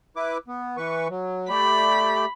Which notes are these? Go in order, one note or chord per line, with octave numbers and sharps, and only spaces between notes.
E4 B4 D6
B3
E3 B4 C#6
F#3
A3 G4 D5 B5